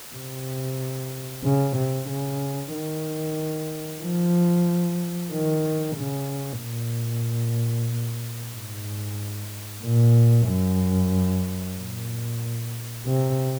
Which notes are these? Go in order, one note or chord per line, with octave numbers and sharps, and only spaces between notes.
C3
C#3
C3
C#3
D#3
F3
D#3
C#3
A#2
G#2
A#2
F#2
A#2
C3